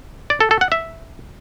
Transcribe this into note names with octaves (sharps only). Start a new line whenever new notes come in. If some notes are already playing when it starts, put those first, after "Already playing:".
D5
A4
A4
F#5
E5